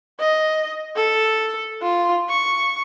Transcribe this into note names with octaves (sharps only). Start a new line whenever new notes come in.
D#5
A4
F4
C#6